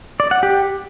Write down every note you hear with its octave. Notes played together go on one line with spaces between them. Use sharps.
D5
F#5
G4